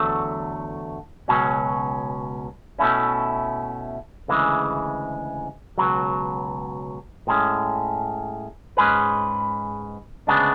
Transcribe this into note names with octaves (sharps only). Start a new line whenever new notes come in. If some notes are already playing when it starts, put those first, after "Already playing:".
Already playing: E2 D3 F#3 A3
C#2 B2 F#3 C#4
B2 A3 C#4 E4
D2 C#3 E3 G#3
C#2 B2 F#3
A2 G#3 C#4
G#2 G#3 C#4 G#4 B4
D2 C#3 G#3 B3 D4